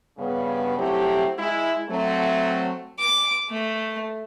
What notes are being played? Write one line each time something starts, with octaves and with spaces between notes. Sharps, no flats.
G2 C#3 B3
F#3 A3 C4 E4 G4
G#3 E4
F#3 A3 C4
D6
A3